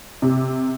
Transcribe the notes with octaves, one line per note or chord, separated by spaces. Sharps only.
C3